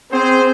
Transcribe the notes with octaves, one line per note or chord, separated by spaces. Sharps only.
C4 G#4 C5